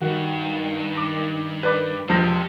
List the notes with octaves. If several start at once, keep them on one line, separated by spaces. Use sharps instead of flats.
G2 D#3 F#4
D6
B4 D5
E1 F3 G4 C5 A#6